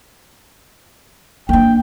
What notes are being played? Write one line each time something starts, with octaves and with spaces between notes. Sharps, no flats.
A#3 D4 G5